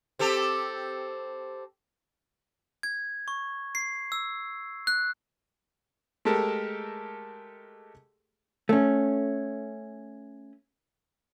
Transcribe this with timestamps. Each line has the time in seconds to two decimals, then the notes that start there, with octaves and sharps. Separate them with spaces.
0.19 C4 G4 A4
2.83 G#6
3.28 C#6
3.75 C7
4.12 E6
4.87 F#6
6.25 G#3 A3 G4 A4 A#4
8.69 A3 C#4